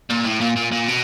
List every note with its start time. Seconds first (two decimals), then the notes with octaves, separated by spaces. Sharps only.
0.10 A#2
0.25 A2
0.41 A#2
0.57 A#2
0.73 A#2
0.89 B2